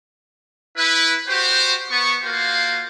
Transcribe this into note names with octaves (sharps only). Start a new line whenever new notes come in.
E4 B4
F#4 G4 C5
B3 C#6
A#3 F4 F#4 C5 F5